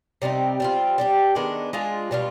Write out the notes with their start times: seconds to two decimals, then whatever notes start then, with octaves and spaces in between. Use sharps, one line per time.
0.22 C3 G3 C4 D#4
0.60 G3 C4 F4
0.98 G3 D4 G4
1.35 D#3 G#3 B3 D4
1.73 G#3 D4 F4 G#4
2.11 B2 G3 D4 F4